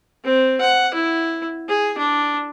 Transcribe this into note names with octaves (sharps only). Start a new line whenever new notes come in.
C4
F#5
E4
G#4
D4